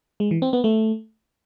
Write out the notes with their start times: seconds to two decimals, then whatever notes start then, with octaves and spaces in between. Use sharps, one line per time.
0.20 G#3
0.31 E3
0.42 C4
0.53 B3
0.64 A3